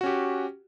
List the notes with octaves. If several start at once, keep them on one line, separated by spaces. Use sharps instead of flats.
C#4 F#4 G4